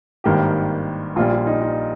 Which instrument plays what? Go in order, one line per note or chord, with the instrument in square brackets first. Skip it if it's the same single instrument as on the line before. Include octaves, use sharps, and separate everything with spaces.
[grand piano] G#1 G2 D#3 A#3 G4
A#1 A#2 G3 F4
F4
D#4
D#4